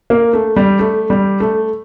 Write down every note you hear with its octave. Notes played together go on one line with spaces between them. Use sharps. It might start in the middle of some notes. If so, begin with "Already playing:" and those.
A#3
A3
G3
A3
G3
A3